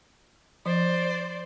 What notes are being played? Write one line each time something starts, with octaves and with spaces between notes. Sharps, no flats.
F3 C5 D5